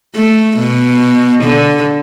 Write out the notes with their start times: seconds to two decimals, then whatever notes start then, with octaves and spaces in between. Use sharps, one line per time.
0.16 A3
0.58 B2
1.44 D3